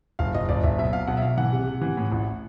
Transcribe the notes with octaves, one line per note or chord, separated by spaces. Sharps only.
F#1 F5
F#1 D#5
F#1 D5
F#1 E5
B1 E5
B1 F5
B1 F#5
E5
B1 F5
E3 F#5
C3
C3
E3
A2
A1